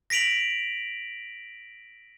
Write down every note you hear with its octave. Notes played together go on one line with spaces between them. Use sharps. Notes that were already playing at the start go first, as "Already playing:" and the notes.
A#6 B6 D7 F7 F#7